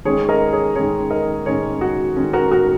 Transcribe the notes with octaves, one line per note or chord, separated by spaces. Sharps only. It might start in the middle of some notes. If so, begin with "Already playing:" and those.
D#3 G#3 C#4 G#4 C#5
A#4 D#5
G#4 C#5
D#3 G#3 C#4 G#4 C#5
A#4 D#5
D#3 G#3 C#4 G#4 C#5
F#4
D#3 G#3 C#4
F#4 A#4
F#4 A#4